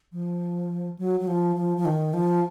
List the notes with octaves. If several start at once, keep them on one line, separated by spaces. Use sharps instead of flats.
F3
F#3
F#3
F3
F3
F3
D#3
F3